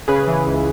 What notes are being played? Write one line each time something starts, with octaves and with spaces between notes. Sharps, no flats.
C#3 G#4 B4
E3
C#2